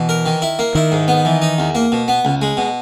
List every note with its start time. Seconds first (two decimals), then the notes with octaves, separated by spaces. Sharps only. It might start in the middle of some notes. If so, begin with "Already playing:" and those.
Already playing: B2 E3
0.09 A#4
0.26 D#3
0.42 E4
0.59 A#3
0.75 D#3 E4
0.92 G#2
1.08 B3
1.25 E3
1.42 D#4
1.58 E2
1.75 A#3
1.92 B2
2.08 B3
2.25 C#2
2.42 G#3
2.57 B2